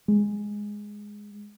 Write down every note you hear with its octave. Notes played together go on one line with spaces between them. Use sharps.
G#3